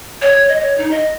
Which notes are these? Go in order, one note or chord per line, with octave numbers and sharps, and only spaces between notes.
C#5
D#5
C#5
D#4
D#5